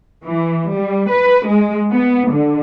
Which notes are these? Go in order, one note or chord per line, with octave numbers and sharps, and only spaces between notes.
E3
G3
B4
G#3
B3
D3